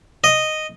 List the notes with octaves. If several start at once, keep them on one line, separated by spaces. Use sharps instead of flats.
D#5